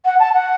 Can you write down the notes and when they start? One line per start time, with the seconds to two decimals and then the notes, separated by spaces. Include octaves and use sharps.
0.05 F#5
0.20 A5
0.33 F#5